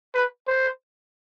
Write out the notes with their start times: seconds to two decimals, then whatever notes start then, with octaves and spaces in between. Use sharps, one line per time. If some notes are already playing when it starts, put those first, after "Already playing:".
0.15 B4
0.47 C5